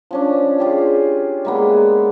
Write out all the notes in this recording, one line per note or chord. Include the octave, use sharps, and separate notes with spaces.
F3 C#4 D4
F4 G4 G#4
G#3 A#3 B3